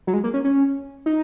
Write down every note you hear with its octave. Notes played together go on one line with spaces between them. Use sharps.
F#3
G#3
A#3
C#4
C#4
D#4